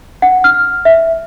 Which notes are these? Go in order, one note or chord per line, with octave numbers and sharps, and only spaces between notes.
F#5
F6
E5